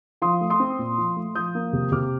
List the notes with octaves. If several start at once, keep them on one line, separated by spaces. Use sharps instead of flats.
F3 C6 D#6
A3
C6 D#6
C4
A#2
F3
A3
F3 D#6 G6
A#3
C3
C3 D6 F6